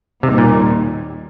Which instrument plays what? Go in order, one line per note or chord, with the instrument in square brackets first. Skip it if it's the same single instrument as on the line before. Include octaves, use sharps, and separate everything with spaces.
[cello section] D#2 D#3 G3 [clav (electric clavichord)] C3
[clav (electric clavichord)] A#2